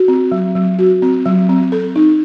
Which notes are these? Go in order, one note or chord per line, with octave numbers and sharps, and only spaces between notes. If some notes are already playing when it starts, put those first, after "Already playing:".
Already playing: F#4
C4
F#3
F#3
F#4
C4
F#3
C4
A4
D#4